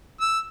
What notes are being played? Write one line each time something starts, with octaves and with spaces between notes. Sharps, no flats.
E6